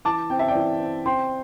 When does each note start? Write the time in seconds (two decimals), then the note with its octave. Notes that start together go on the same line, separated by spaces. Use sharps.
0.05 E3 A5 D6
0.30 C4 G5
0.39 E5
0.48 D5 G5
0.55 E3
0.80 C4
1.05 C4 G5 C6